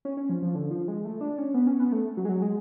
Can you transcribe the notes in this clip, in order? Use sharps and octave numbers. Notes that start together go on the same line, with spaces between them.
C#4
C#4
F3
F3
D3
F3
G#3
A3
D4
C#4
B3
C#4
B3
A3
F#3
G#3
F#3
G#3